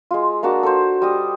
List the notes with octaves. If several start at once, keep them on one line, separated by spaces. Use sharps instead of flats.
G#3 F4
A#3 D4 F#4 A5
A4 C5
G3 D#5 D#6